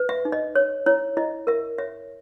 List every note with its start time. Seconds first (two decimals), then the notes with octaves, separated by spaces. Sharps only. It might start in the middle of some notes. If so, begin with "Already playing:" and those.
Already playing: B4
0.09 E5
0.25 D#4
0.32 D#5
0.55 C#5
0.86 E4 C#5
1.17 E4 D#5
1.47 A#4 E5
1.78 C#5 E5